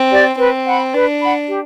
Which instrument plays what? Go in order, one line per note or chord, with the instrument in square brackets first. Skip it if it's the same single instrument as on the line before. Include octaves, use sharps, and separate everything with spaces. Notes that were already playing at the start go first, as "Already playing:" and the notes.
Already playing: [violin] C4
[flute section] G4 D5
[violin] C4 [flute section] B4
[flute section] F#5 B5
[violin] D4 [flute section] B4
[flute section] F#5 B5
G4